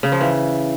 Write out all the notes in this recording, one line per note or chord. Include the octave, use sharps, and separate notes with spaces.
C#3
F3
E3